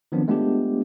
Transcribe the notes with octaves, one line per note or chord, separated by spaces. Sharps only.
D#3 F3 F#3 B3 C4 D4
G#3 A3 B3 D4 F4 G4